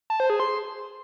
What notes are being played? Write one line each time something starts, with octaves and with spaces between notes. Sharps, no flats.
A5
C5
G#4
C6